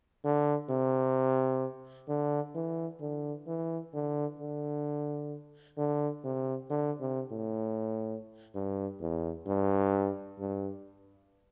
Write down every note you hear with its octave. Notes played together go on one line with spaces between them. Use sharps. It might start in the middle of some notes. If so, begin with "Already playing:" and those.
D3
C3
D3
E3
D3
E3
D3
D3
D3
C3
D3
C3
A2
G2
E2
G2
G2